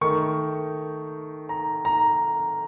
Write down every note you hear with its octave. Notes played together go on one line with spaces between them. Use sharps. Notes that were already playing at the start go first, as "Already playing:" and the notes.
D#3 A3 D#4 C#6
A#5
A#5